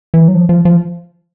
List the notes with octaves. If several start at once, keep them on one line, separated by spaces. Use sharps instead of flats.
E3
F#3
F3
F3
F3